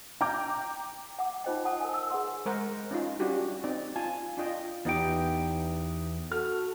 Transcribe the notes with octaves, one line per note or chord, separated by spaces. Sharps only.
G5 A#5 D6 G6
F#5 D6
D#4 F4 C5 D#5 G5
F#5 A5 D#6
A#4 C5 G#5
E6
G#4 B4 F#5 C6
G#3 A#4 C5 F#5
C#4 D#4 F4
G3 C#4 D4 F#4 G4
C4 D#4 D5
F4 G#5 A5
D4 F4 D#5 G5
E2 B3 D#4 G4 G5
F#4 A4 F6